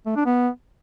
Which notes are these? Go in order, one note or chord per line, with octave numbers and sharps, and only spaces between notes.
A3
D4
B3